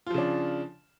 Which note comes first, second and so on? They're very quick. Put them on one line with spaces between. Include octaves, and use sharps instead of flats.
F4 F3 C#3 D4